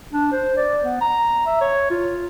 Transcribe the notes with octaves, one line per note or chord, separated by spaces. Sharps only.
D4
C5
D5
B3
A#5
E5
C#5
F4